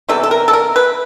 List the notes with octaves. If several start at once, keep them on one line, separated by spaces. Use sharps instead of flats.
C3 E3 G3 B3 A4
A4
A#4
A4
A#4
B4